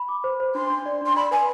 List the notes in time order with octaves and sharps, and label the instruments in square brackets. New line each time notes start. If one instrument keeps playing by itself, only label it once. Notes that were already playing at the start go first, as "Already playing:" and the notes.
Already playing: [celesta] B5
D6
C5
C5
[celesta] D4 [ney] C6
[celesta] D4
D5
[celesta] D4 [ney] C6
[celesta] D5 [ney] B5
[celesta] B4 [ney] G#5